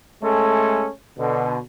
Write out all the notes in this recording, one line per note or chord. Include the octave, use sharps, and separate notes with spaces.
G#3 A3 C#4 A4
B2 D3